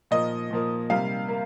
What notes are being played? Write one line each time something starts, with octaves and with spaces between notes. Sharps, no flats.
A#2 F3 A#3 D#5
A#2 F3 A#3
C3 G3 A#3 F5
A#3